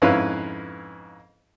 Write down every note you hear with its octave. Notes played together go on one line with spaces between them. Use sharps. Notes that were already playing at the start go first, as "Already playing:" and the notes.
F2 G#2 C#4 E4 B4 F5